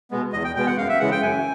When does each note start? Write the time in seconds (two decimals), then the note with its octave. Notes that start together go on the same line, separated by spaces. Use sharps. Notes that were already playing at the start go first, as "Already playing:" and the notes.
0.11 B2 G#3 B3
0.33 E2 D#5
0.44 G5
0.55 B2 G#3 B3 G5
0.67 F#5
0.77 F#2 F5
0.89 E5
1.00 C#3 E3 G#3 F#5
1.11 G5
1.22 F#2 G#5